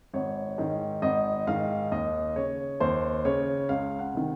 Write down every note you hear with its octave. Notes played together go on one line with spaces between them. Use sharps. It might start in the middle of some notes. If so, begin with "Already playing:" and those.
G#1 C#5
G#2 D#3
G#1 D#5
G#2 D#3 F5
D#2 D#5
C#3 C#5
D#2 C5
C#3 C#5
C#2 F5
F#5
C3 D#3